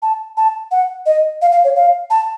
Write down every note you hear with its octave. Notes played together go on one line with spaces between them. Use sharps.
A5
A5
F#5
D#5
F5
F5
C#5
F5
A5